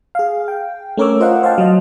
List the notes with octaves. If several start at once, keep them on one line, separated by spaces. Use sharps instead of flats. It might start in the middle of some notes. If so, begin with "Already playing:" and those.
G#4 F5
G5
A3 C#4 A#4 C#5 D6 E6
F4 C5 D#5 F5 F#5
C5 F5 G5 A5
F#3 D#5